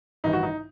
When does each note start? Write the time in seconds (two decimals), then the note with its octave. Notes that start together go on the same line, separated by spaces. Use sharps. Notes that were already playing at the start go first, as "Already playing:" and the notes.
0.24 A1 G2 D#3 D#4
0.33 F#4
0.43 D#4